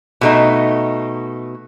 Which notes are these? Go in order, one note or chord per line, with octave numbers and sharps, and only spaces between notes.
B2 A3 D#4